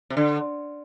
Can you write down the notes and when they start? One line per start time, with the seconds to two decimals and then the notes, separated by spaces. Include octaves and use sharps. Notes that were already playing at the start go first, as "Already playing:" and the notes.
0.10 C3
0.17 D3